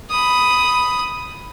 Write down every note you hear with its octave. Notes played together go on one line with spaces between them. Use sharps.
B5 D#6